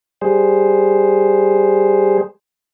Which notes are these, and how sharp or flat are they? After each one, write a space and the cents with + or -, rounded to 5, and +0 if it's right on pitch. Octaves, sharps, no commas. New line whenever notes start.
G3 +0 G#4 +0 C5 +0